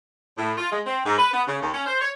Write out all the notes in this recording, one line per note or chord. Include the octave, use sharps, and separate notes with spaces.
A2
F4
G#3
C4
G#2
B4
B3
C#3
D#2
C#4
C5
C#5